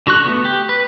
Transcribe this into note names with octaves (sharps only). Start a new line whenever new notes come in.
D3 F#4 C#6 F#6
A3 B3
G4
B4